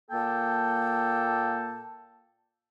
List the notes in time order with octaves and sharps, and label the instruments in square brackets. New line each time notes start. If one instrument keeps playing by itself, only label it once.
[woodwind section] A#2 A#3 A4 G5 A5